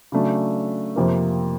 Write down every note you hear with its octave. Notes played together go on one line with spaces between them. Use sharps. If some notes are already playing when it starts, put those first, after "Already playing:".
C#3 F#3 A3 D4
F2 C3 F3 A#3